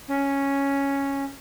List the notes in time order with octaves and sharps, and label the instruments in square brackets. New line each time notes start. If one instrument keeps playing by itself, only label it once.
[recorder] C#4